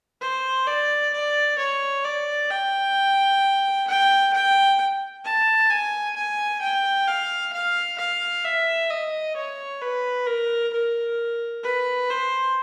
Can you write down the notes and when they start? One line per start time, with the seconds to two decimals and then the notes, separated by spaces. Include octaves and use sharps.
0.21 C5
0.67 D5
1.13 D5
1.59 C#5
2.05 D5
2.50 G5
3.87 G5
4.33 G5
5.24 A5
5.70 G#5
6.16 G#5
6.61 G5
7.07 F5
7.53 F5
7.98 F5
8.44 E5
8.90 D#5
9.36 C#5
9.81 B4
10.27 A#4
10.73 A#4
11.64 B4
12.10 C5